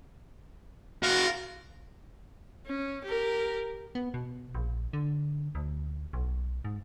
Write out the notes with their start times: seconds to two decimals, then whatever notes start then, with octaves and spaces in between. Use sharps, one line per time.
1.03 F#4 A#4 F5
2.66 C#4
3.04 G4 A#4
3.95 B3
4.14 B2
4.55 A#1
4.93 D3
5.55 D2
6.13 B1
6.65 G#2